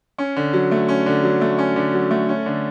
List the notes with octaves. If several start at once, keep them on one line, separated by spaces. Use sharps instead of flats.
C#4
D3
F#3
A3
C#4
D3
F#3
A3
C#4
D3
F#3
A3
C#4
D3